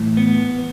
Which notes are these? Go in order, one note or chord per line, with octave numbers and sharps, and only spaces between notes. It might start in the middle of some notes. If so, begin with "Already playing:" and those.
Already playing: A2 E3
B3